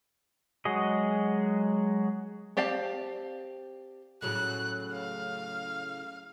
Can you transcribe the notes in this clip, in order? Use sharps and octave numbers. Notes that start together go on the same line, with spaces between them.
F#3 G#3 F#4 G#4 D#5
C4 G4 D5 F5 A5
A2 C#3 F#3 F#6
F5